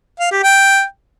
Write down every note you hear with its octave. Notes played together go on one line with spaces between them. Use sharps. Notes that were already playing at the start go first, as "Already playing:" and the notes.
F5
G4
G5